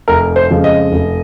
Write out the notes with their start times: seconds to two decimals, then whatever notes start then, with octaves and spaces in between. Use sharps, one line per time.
0.08 F1 A#4
0.36 C5
0.51 F2 C#3 F3 G#3
0.64 D#5
0.92 F1